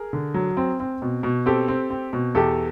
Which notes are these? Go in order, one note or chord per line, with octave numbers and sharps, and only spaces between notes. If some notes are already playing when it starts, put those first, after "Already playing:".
Already playing: G#4 A#4
D3
F#3
C4
C4
B2
B2
C4 G4 A4
C4
C4
B2
E2 G4 A4